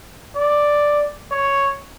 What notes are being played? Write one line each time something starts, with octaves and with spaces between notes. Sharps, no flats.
D5
C#5